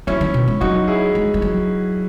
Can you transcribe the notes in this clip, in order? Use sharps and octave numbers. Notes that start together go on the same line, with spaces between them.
F#3 C#4 E4
D#3
B2
G#3
F#3 D#4 F#4
E4 G#4
G#3
G#3
F#3